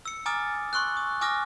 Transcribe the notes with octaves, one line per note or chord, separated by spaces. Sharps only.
E6 C#7
G#5 A#5 D6 D#6 F6 A6
C6 C#6 E6 F#6
D#6
G#5 D6 D#6 F6 A#6